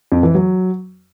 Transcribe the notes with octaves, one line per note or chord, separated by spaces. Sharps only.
F2
E3
F#3